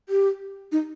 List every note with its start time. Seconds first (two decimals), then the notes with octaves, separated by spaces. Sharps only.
0.09 G4
0.72 D#4